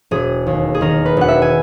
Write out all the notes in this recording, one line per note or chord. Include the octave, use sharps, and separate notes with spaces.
E1 G#4
D#2
G#4
D#3 A#4
B4
E1 F#5
E5
G#5